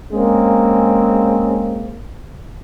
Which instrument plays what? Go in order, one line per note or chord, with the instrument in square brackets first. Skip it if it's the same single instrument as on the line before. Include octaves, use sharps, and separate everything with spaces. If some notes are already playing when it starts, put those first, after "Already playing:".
[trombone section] G#3 A#3 C4 C#4